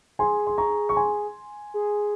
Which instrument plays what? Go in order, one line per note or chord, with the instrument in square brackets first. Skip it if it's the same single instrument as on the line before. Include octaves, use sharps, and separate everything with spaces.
[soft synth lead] G#4 [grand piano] G#5 C6
[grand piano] C6
A#5 C#6
C#6
G#5 C6
[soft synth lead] G#4